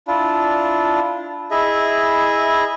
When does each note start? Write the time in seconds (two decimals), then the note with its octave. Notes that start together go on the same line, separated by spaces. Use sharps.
0.08 D4 E4 F4
1.51 E4 G#4 D#5 E5